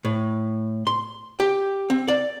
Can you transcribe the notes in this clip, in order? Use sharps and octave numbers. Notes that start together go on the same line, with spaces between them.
A2
C6
G4
C4
D5